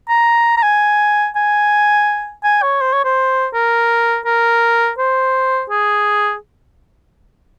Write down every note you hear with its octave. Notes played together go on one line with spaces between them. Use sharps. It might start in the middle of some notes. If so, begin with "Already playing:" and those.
A#5
A#5
G#5
G#5
G#5
C#5
C5
C#5
C5
A#4
A#4
C5
G#4